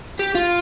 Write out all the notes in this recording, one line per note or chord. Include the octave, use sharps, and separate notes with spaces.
G4
F4